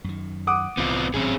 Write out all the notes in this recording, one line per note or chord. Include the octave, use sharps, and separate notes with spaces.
F#2 D#3
F#5 D6 D#6
C2 A2 E3 B3 C4 F4
G#1 A2 F#3 C4 C#4 G#4